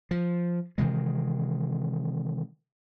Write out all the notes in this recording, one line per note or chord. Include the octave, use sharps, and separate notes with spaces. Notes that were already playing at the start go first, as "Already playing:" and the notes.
F3
C3 D#3 E3 G#3